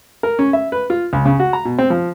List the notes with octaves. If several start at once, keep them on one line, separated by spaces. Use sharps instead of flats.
A#4
C#4
E5
B4
F4
C#2
C#3
F#4
A#5
B2
C4
F3